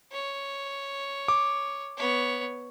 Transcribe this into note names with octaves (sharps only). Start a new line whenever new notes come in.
C#5
D6
B3 C#5